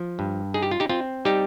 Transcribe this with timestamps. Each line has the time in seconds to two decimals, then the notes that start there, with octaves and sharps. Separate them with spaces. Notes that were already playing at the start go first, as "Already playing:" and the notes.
Already playing: F3
0.19 G2
0.54 D#4 G#4
0.63 G4
0.71 F4
0.80 D#4 G4
0.89 C4 F4
1.25 G3 D#4 G4